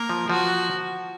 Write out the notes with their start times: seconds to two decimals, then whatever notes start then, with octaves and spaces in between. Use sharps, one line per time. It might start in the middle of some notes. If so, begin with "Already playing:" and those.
Already playing: A#3 A#4
0.09 F3
0.30 F3 F#4